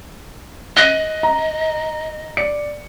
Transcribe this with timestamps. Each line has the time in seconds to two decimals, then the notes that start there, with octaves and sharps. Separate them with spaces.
0.77 D#5 F#6 A#6 D#7
1.23 A#5
2.37 D5 C#7